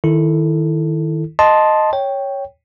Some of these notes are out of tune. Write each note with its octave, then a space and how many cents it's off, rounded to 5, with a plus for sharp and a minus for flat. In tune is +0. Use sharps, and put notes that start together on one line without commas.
D#3 +0 E4 +0 A4 +5
D#5 +0 A5 -5 C6 +0
C#5 +0 G5 +0